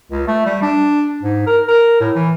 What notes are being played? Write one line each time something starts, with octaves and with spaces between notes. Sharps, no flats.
C#2
A3
G3
D4
G#2
A#4
A#4
A2
E3